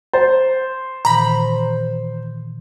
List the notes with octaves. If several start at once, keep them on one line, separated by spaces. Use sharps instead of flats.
C5 A6
A#2 D#3 E3 A#5 B5